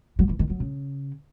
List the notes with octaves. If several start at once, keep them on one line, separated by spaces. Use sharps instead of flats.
F#3
E3
D#3
F#3
C#3